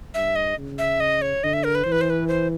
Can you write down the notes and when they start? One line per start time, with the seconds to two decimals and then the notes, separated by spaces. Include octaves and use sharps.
0.14 G2 E5
0.36 D#5
0.57 C#3
0.78 E5
1.00 D#5
1.22 C#5
1.44 D3 D#5
1.53 E5
1.64 A#4
1.75 B4
1.84 E3 C5
1.92 B4
2.01 C5
2.10 B4
2.28 C5